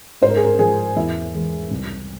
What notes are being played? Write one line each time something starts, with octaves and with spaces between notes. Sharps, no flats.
G#2 C5
A#4
G#4
A#4
F3 G#3 G#4
E2 E4
E3 G#3
C2